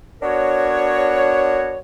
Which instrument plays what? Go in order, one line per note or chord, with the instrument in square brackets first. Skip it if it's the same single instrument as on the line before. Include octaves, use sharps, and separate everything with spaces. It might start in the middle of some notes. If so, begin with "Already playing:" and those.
[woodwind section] B3 D4 F#4 A#4 C#5